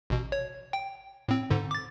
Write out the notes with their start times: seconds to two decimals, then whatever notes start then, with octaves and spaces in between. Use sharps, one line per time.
0.10 A1 B2
0.32 C#5
0.73 G5
1.28 A2 C4
1.50 G#2 D3
1.71 D6 A6